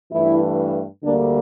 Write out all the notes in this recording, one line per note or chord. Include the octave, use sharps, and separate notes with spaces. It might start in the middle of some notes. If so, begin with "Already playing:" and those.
G2 E3 A3 E4
D2 D3 G3 A#3 D4